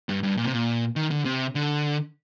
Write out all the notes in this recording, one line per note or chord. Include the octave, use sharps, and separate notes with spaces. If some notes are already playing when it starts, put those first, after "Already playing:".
G2
G2
A#2
C3
A#2
D#3
D3
C3
D3